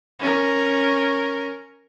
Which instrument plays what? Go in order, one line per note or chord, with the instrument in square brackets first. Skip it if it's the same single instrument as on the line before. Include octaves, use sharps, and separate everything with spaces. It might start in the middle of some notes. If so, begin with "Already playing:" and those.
[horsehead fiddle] C#4 A#4